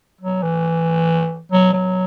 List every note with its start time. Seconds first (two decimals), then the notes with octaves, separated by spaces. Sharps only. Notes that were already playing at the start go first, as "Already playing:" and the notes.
0.21 F#3
0.42 E3
1.52 F#3
1.73 F#3